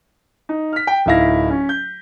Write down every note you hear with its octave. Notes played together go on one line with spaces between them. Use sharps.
D#4
F6 B6
G5
D1 D#4 E4 F5 A#6
C#4
G6